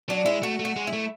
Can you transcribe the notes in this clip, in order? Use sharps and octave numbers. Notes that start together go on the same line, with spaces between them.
F#3 D4
G#3 E4
A3 F#4
A3
F#4
G#3
E4
A3